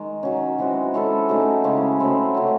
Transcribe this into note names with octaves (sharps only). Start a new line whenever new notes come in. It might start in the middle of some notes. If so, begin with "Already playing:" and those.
Already playing: D#3 G#3
D#3 F#3 C#4
E3 G#3 C4 F#4
G#3 C#4 E4 A4
F#3 A3 D#4 G#4
C#3 G#3 C#4 E4
F#3 A3 C4 E4
F#3 A3 C#4